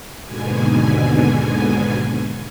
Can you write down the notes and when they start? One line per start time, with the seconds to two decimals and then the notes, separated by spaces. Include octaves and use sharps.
0.24 D#2 G#2 B2 D3 G#5